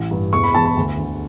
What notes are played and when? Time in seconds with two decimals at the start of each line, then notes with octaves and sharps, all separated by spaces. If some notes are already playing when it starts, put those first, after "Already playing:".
Already playing: A1
0.11 G2
0.33 E1 C#6
0.43 B5
0.54 E2 A5
0.65 B5
0.76 D2
0.98 D3